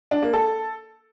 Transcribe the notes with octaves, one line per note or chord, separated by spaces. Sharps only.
D4
A#3
A4